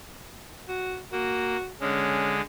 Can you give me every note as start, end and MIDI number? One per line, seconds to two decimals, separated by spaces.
0.68 0.99 66
1.12 1.56 58
1.12 1.70 66
1.81 2.41 50
1.81 2.41 56
1.81 2.35 61